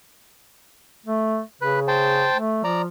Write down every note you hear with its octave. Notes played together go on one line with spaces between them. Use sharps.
A3
C#3 B4
C5 G5 A5
A3
F3 D5 A#5